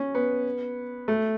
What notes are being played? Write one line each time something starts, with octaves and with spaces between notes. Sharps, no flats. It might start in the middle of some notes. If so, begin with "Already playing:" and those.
Already playing: C#4
B3
A3